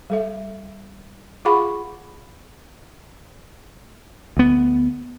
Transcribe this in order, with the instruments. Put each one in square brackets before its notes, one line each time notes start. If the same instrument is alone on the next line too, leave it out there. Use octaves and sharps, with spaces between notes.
[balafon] G3 A4 E5
F4 G#4 F5 F#5 B5 C#6
[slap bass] D2 B3